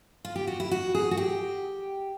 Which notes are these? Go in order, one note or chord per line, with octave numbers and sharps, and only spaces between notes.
F4
G4
F#4
E4
F#4
G#4
F#4
G4